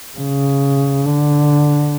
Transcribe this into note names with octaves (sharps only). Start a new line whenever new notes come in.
C#3
D3